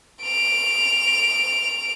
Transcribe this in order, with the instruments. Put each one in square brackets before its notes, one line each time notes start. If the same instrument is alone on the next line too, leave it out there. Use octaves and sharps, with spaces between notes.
[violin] D7 F7